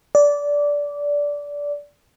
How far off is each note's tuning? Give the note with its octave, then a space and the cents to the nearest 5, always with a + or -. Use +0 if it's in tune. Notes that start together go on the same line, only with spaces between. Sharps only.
D5 -15